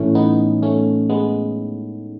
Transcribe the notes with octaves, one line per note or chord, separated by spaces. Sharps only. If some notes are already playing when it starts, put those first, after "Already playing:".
Already playing: A2 E3 A3 C#4
B3 D#4
A3 C#4
G#3 B3